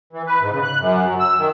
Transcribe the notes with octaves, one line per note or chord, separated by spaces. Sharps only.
E3
B4
G#2
C#3
F#6
F#2
F#3
E6
D#3